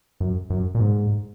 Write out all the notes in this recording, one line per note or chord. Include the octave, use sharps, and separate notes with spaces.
F#2
F#2
A#2
G#2